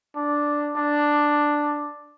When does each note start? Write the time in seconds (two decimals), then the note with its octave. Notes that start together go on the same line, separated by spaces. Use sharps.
0.16 D4
0.76 D4